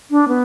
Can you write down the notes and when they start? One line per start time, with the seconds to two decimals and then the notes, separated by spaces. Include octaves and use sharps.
0.11 D4
0.28 B3